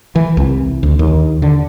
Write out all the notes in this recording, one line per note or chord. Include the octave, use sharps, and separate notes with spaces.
E3
C2
D2
D#2
D3